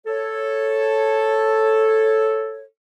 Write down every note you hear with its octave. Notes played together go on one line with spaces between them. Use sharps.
A4 C#5